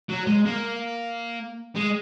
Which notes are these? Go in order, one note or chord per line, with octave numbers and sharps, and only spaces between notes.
F#3
G#3
A#3
G#3